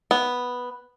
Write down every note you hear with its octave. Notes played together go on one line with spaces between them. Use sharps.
B3